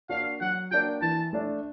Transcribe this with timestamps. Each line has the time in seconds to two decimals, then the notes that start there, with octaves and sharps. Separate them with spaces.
0.09 A#3 D4 F#4 F5
0.41 F#3 F#5
0.71 A#3 D4 F#4 G5
1.02 E3 A5
1.33 A3 D4